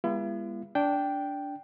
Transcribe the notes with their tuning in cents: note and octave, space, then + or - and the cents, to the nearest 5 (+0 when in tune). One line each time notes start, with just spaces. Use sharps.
G#3 -40 B3 -30 E4 +45
D4 -15 G5 +0